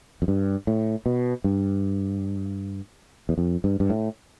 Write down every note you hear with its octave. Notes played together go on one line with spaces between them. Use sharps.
F2
G2
A2
B2
G2
E2
F2
G2
G2
A2